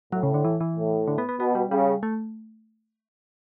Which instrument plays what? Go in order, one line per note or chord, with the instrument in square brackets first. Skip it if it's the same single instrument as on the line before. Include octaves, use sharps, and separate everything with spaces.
[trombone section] A2 [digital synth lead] F#3
[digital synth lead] C#3
D3
E3
E3
[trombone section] A2
[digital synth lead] D3
B3
B3
[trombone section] B2 [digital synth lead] B3
[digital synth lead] G3
[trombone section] C#3 [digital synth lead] G3
[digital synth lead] A3